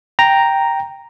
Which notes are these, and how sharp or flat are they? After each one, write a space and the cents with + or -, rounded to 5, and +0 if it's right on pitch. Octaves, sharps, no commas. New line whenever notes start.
G5 +0 A#5 +0